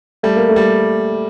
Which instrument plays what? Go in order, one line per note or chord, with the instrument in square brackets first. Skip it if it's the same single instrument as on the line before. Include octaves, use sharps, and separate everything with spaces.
[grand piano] G3 [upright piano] A3
[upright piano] A#3
A3
[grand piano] G3